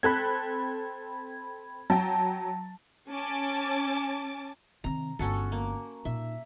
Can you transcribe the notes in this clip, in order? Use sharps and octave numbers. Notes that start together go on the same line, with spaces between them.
C4 A4 B5 F#6 G#6
F#3 G5 A5
C#4 G#5 A5 D6
C3 D#3 A#5
G1 G#3 C#4 F#4 A4
A#3
A#2 D#4 E5